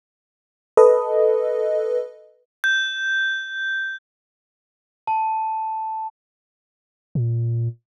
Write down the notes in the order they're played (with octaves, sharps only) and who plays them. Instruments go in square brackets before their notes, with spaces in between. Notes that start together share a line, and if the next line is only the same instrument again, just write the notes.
[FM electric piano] A4 B4 D#5
[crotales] G6
[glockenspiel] A5
[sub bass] A#2